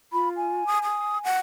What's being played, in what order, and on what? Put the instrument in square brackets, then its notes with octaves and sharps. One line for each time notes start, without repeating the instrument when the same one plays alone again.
[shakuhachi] F4 [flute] B5
[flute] G#5
[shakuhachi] D#6
D#6
F#5